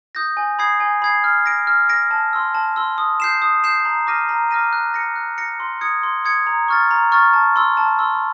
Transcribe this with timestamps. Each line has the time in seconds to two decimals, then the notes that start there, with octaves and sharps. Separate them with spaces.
0.15 D#6 G6 A#6
0.37 G#5
0.59 B5 D#6 G#6 C7
0.80 G#5
1.02 B5 D#6 G#6 C7
1.24 F6
1.46 A#6 D7
1.67 F6
1.89 A#6 D7
2.11 A5
2.33 C6 E6
2.55 A5
2.76 C6 E6
2.98 D#6
3.20 G6 C7 E7
3.42 D#6
3.64 G6 C7 E7
3.85 A#5
4.07 D6 F6 A#6 D#7
4.29 A#5
4.51 D6 F6 A#6 D#7
4.73 F#6
4.94 A#6 C#7
5.16 F#6
5.38 A#6 C#7
5.60 C6
5.81 D#6 G#6 C#7
6.03 C6
6.25 D#6 G#6 C#7
6.47 A#5
6.68 C#6 F6 A6
6.91 A#5
7.12 C#6 F6 A6
7.33 A5
7.56 C6 E6
7.77 A5
7.99 C6 E6